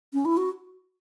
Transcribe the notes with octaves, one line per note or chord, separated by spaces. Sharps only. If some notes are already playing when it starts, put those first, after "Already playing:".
C#4
E4
F#4